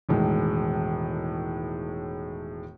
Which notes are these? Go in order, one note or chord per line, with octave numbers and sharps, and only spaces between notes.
E1 A2 D#3 G#3